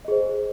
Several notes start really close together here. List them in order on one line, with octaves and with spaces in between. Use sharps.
D#5 G#4 C5